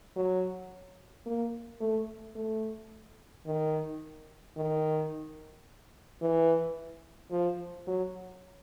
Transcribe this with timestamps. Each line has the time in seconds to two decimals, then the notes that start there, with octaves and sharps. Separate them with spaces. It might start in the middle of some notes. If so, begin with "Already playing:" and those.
0.16 F#3
1.26 A#3
1.80 A3
2.35 A3
3.47 D#3
4.57 D#3
6.22 E3
7.31 F3
7.87 F#3